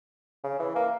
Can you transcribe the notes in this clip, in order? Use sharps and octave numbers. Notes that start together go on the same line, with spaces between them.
C#3
E3
A#3